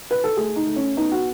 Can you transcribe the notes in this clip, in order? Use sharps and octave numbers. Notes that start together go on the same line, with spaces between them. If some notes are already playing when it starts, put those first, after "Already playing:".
B4
A4
A3 G#4
D#4
A3
C#4
B3 D#4
F#4